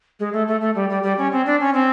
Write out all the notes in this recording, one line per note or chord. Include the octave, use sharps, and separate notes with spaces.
G#3
A3
A3
A3
G3
G3
G3
C#4
C4
D4
C#4
C4